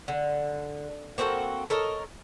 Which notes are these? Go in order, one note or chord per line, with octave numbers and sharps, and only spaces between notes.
D3
A#3 C4 F#4 A4
A4 A#4 C#5 D#5